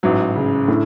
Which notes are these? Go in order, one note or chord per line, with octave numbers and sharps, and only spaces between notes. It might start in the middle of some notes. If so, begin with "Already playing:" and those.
A1 G#2 F#3
C#3
A2 D3